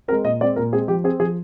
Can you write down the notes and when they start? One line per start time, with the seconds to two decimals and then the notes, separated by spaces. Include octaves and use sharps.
0.08 C4 A#4
0.12 G#3
0.24 A#2 D#5
0.41 G#3 C4 D5
0.56 A#2 A#4
0.72 G#3 C4 G#4
0.88 F3 G4
1.04 C4 G#4
1.20 F3 G#4